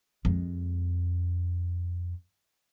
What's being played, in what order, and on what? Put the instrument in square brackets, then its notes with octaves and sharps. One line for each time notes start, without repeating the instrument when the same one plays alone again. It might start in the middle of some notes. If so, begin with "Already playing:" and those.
[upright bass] F2 G#3